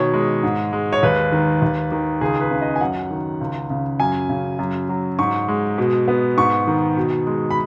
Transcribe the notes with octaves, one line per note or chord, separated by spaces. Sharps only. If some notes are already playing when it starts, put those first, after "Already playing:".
Already playing: B2 D#3 C#5
G#3
G#2
G#3
C#5
D#2 B4
D#3
D#2
D#3
C#2 G#4
B4
C#3
D#5
G#5
F#2 F#5
D#3
C#2
C#3
F#2 G#5
C#3
F#2
F#3
G#2 C#6
G#3
B2
B3
G#2 C#6
D#3
B2
G#3
B5